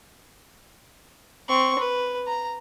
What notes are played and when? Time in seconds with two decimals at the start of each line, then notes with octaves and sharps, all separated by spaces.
1.48 C4 C#6
1.79 B4
2.26 A#5